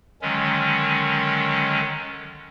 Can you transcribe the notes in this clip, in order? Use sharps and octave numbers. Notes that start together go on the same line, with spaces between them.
D3 D#3 F#3 G#3 C#4